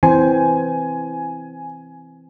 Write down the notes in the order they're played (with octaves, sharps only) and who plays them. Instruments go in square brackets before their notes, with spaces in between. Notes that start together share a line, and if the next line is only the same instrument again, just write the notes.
[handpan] E3 C4 C5 [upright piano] G#5